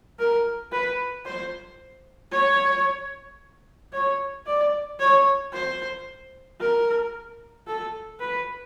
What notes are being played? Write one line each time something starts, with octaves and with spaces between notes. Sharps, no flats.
A#4
B4
C5
C#5
C#5
D5
C#5
C5
A#4
A4
B4